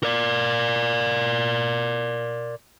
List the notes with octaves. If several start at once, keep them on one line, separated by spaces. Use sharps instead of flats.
A#4 D5